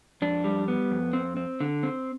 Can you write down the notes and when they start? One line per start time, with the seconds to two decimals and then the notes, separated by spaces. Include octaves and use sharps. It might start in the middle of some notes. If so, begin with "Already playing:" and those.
0.22 F2 D4
0.44 G3
0.68 B3
0.91 F2
1.13 C4
1.37 C4
1.60 D3
1.83 C4